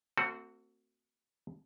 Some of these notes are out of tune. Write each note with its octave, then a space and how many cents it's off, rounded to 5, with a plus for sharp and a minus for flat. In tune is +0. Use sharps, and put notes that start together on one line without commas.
A3 +45 C4 +0 F#4 +0